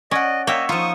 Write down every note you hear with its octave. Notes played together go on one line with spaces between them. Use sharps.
C#4 D5 D#5 F#5
A#3 C#5 D#5 E5 G5
F3 D#4 F4 C#6 D#6